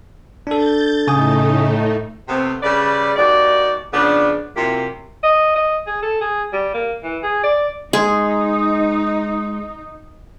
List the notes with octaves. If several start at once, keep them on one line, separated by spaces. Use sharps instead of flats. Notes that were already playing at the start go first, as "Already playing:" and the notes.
D4 A4 G6 A6
A2 C#3 A3 D#4 G#5 D#6
C3 A3 B3 C4
C#3 G3 B4 D5
D#2 D#4 F#4 D5
C#3 F3 B3 D4
C3 F#3 A#3 E4 F4 G4
D#5
D#5
G#4
A4
G#4
G3
A#3
E3
G#4
D5
G#3 D#4 G#4 C6